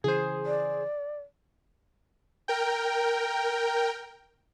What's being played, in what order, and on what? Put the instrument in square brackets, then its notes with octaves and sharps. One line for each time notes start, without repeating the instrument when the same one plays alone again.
[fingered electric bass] C#3 E3 [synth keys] G#4 C5
[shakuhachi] D5
[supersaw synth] A#4 G5